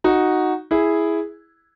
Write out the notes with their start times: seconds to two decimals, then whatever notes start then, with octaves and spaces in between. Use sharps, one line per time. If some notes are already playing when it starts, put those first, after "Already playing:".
0.04 D#4 F#4
0.71 E4 G#4